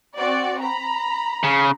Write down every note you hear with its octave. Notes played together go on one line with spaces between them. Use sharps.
C4 F#4 D5
A#5 B5
C#3